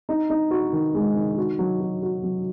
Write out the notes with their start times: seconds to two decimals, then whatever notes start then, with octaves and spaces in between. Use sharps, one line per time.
0.09 D#4
0.30 D#4
0.51 F#4
0.73 D#3
0.94 G#3
1.16 D#3
1.37 F#4
1.59 F#3
1.81 F#4
2.03 F#4
2.23 F#3